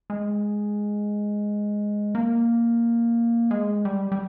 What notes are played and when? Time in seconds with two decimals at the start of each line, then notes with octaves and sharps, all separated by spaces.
0.10 G#3
2.15 A#3
3.51 G#3
3.85 G3
4.12 G3